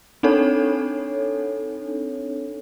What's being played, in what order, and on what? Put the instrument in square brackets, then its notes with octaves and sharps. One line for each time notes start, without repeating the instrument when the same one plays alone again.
[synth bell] C4 D4 D#4 A4 C#5